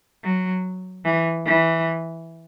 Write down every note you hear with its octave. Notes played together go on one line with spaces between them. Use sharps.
F#3
E3
E3